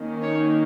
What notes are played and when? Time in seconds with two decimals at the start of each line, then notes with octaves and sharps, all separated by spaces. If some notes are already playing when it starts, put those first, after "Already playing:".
Already playing: D#3 A#3 C#4
0.22 C#5